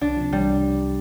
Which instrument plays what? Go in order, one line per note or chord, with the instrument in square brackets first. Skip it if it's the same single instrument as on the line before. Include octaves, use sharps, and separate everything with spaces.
[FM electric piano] C2 [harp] D4
[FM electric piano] C3 F3
[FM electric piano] C2 [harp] G3